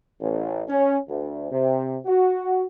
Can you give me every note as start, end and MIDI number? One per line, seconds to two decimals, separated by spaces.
0.21 0.63 33
0.69 0.97 61
1.08 1.47 38
1.51 1.97 48
2.06 2.64 66